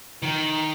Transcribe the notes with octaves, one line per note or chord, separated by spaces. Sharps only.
D#3